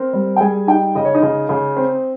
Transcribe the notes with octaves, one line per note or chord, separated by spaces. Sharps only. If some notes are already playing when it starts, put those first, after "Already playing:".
Already playing: C4 A#4
G3
G5
G3 G#4 G#5
D#4 G4 G5
C#3 D#5
C#5
D#4 D#5
C#3
C#3
C4